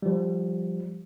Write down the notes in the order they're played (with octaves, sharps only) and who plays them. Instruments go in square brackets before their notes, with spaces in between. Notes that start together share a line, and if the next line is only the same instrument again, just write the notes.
[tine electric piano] F3 G3